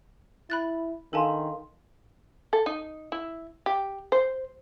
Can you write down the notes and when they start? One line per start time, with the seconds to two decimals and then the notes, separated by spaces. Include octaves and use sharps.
0.50 E4 B5 F#6 A6
1.13 D#3 D4 A4 F5 G#5 A5 C6
2.53 A4
2.66 D#4
3.12 E4
3.66 G4
4.12 C5